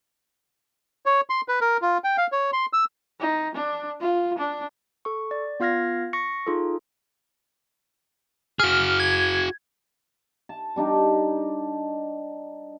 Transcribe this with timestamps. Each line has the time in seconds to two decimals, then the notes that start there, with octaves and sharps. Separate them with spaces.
1.06 C#5
1.30 C6
1.48 B4
1.61 A#4
1.82 F4
2.04 G5
2.17 F5
2.32 C#5
2.53 C6
2.73 E6
3.20 D#4
3.55 D4
4.01 F4
4.38 D4
5.05 A4 C#6
5.31 D5
5.60 B3 F4 F5 F6 G#6 A#6
6.13 C#6 A#6 C#7
6.47 D#4 F4 G#4 A4
8.59 F#4 G#4 F6
9.00 G#6
10.49 A5
10.76 G3 D4 D#4 G5